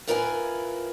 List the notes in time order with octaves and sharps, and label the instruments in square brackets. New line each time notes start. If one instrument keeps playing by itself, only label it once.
[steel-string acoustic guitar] A2 F4 A#4 B4 E5 G#5